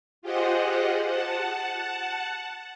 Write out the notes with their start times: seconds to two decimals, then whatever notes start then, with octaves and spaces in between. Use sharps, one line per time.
0.22 F4 G4 G#4 C5 D#5 F#5
1.08 F#5 A5